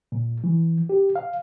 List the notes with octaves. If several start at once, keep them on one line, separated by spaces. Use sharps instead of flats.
A#2
E3
G4
F5